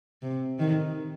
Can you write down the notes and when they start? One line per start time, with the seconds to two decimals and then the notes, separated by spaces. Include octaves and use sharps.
0.22 C3
0.59 D#3